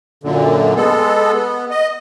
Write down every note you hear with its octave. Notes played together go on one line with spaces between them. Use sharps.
F#2 A#2 D3
G#3 B3 A4
B3
D#5